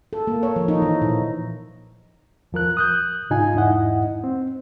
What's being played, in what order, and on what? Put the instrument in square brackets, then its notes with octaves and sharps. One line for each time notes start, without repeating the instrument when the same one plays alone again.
[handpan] A4
A#3
C#5
F3
D#4
E3
A#2
[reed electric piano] E2 F3 A#4 F#6
D#6 F#6 G6
G#2 C#3 D#4 F4 G#5
E2 G#2 D#4 E4 D#5 F#5
C4